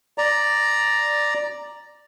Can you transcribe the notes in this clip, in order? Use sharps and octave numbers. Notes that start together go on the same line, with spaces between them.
D5 A#5